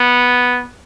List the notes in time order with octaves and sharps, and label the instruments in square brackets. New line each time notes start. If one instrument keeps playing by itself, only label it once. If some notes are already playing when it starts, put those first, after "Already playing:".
Already playing: [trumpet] B3